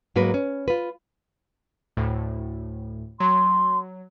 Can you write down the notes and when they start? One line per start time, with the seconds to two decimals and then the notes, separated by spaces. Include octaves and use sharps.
0.16 G#2 F#3 A#3 A#4 B4
0.34 C#4
0.68 F4 B4
1.97 D2 A2
3.20 F#3 C6